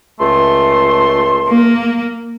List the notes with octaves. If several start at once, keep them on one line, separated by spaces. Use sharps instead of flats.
C#2 A3 C6
A#3